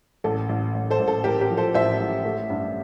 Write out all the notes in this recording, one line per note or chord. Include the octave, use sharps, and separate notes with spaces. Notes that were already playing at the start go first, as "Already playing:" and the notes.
A1 A4
A1
A1
A4 C5
A1
A4
A1 G4 A#4
G4 A#4
F3
A4 C5
A1 C5 E5
A1
A3
G2